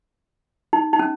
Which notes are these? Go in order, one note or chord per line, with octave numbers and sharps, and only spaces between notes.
D#4
D#4
C#4